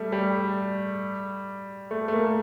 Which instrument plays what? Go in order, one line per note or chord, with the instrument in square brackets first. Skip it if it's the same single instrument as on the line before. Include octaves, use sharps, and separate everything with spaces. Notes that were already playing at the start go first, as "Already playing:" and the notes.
Already playing: [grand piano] G3 A3
G3
A3
A3
A#3